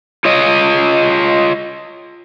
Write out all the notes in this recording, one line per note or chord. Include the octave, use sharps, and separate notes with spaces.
F4 C#5 D#5